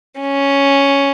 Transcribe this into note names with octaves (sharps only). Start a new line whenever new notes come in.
C#4